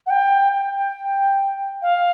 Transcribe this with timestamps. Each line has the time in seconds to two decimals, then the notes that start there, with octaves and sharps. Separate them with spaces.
0.06 F#5
0.10 G5
0.52 G5
1.82 F5